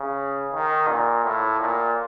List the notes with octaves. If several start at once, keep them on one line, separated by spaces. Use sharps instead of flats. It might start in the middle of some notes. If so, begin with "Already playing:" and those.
Already playing: C#3
D#3
A#2
A2
A#2